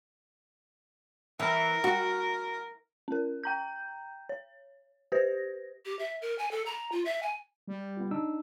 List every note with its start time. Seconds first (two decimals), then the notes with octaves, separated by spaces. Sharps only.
1.40 E3 A#4
1.84 F#4
3.08 C#4 A#4
3.44 G5 A#5 G6
4.29 C#5
5.12 G4 B4 C5 A#6
5.86 G4
5.99 E5
6.22 A#4
6.39 G#5
6.51 A4
6.66 A#5
6.92 F4
7.05 E5
7.23 G#5
7.68 G3
7.97 B3 F4
8.11 D4 D#4 E6